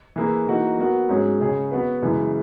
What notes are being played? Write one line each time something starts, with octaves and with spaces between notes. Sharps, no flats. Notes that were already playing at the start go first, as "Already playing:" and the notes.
E3 A#3 E4 G#4 B4
E3 A#3 D#4 F#4
F#3 B3 F#4 A#4
G#2 F#3 C#4 G#4
C#3 G#3 C#4 G#4
F#3 B3 F#4 B4
F#2 C#3 E3 G#3